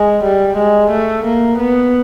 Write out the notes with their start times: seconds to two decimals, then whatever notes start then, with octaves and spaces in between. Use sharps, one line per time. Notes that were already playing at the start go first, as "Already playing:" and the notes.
Already playing: G#3
0.24 G3
0.57 G#3
0.91 A3
1.25 A#3
1.58 B3